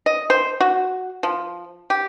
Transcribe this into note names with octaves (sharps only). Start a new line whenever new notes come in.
D#5
C5
F#4
F3
G4